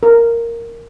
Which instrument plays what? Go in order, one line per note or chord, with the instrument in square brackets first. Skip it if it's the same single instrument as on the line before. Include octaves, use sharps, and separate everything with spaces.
[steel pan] A#4